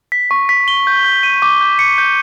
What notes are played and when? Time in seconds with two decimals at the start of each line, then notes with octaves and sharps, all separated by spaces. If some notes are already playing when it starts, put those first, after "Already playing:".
0.12 B6
0.31 C#6
0.49 B6
0.68 G7
0.87 G6
1.05 G6
1.23 D#7
1.42 D6
1.61 G6
1.79 C#7
1.98 G6